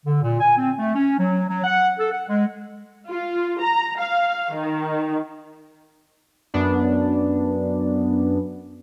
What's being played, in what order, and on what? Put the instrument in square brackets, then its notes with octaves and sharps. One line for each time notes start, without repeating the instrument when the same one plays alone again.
[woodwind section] D3
A#2
G#5
C4
A3
C#4
F#3
F#3
F#5
A4
F#5
G#3
[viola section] F4
A#5
F5
D#3
[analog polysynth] F#2 B3 D4